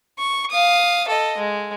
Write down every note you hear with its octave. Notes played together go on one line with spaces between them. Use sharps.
C#6
F5 D#6
A4 D#5
G#3